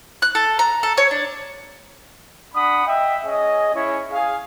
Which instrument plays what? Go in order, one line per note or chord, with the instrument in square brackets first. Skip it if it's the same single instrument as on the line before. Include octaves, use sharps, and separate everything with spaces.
[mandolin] F#6
A4
A#5
A4
C#5
D4
[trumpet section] D4 F#5 B5 D#6
D#5 E5 G5
C#4 G#4 D#5
G#3 C#4 E4 C#5
G#4 F5